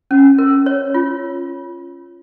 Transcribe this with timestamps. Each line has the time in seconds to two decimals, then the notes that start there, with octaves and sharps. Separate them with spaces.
0.11 C#4
0.38 A#4
0.66 C#5
0.94 F4